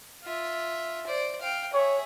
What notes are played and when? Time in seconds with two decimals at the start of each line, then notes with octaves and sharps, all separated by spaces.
0.24 F4 E5
1.07 C5 D5
1.42 F5 G5
1.74 G#4 C#5 E5